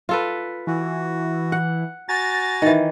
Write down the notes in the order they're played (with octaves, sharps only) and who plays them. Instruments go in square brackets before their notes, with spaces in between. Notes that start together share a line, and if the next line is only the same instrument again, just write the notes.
[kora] F4 A4 B4
[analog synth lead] E3 [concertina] F#4
[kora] F#5
[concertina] F#4 G#5 A#5 [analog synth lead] A6
[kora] D#3 E3